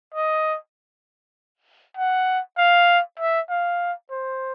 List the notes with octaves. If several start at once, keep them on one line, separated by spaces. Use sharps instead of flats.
D#5
F#5
F5
E5
F5
C5